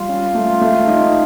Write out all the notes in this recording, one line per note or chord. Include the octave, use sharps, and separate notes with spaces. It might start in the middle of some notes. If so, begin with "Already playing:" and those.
Already playing: G3 F4
C#4
A3
A3
D#4